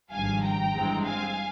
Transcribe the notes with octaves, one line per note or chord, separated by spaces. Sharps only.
G#1 G2 F3 F5 G#5
G5 A#5
G2 E3 G#3 C4
F5 G#5